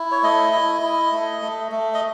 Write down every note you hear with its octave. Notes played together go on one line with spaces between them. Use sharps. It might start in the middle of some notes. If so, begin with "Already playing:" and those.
Already playing: E4
C#5
A3 D#5
E4
E4
A3
A3
A3
D#5